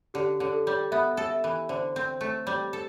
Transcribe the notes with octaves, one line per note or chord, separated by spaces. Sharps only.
D3 G4
D3
A4
G3
B3 E5
A4
E5
E3
D3 C5
C4
A3
G3
A4